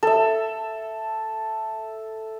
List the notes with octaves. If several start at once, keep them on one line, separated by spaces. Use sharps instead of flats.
A4 E5